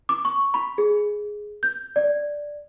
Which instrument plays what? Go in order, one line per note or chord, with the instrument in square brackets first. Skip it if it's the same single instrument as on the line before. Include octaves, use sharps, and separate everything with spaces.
[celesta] D6
C#6
B5
G#4
G6
D5